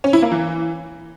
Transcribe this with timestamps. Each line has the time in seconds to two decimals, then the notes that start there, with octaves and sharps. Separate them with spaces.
0.04 C#4
0.13 E4
0.22 A#3
0.32 E3